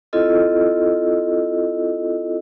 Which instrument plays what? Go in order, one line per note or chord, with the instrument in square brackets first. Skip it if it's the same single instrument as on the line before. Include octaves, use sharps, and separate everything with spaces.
[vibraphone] C4 E4 F4 A4 D#5 E6